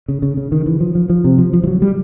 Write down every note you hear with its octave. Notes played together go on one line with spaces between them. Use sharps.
C#3
C#3
C#3
D#3
E3
F3
F3
F3
C3
F3
F3
F3
F#3
G3